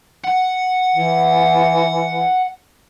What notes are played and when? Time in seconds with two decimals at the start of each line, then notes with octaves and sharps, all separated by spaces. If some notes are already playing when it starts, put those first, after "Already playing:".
0.24 F#5
0.94 E3